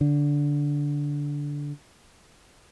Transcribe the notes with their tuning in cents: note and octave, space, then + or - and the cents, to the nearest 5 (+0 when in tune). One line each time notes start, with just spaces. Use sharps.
D3 -15